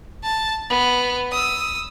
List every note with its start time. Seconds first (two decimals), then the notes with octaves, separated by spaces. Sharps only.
0.23 A5
0.69 B3
1.31 D#6 E6